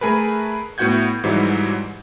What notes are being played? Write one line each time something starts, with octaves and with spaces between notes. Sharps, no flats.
A3 G#4 A#4 B4
A2 B3 F#4 F#5 G6 G#6
G#2 E3 F#3 G3